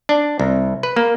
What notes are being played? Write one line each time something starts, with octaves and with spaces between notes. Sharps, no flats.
D4
C2
B4
A#3